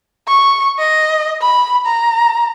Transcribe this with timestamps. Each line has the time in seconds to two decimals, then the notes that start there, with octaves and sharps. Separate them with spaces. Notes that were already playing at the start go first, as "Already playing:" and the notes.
0.28 C#6
0.79 D#5
1.42 B5
1.87 A#5